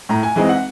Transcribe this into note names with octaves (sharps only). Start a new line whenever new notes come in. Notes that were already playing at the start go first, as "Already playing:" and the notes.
A2 A#5
G#5
E3 G#3 C4 D#4
F#5